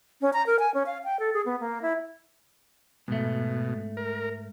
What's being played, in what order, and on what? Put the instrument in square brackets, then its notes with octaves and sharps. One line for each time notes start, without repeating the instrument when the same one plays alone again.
[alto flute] C#4
A#5
A#4
G#5
C#4
F5
G5
A4
G#4
B3
A#3
E4
[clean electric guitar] G#2 A3 [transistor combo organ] B2
[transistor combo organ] A#4